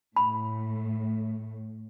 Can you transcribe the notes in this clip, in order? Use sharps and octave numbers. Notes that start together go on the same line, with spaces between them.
A2 B5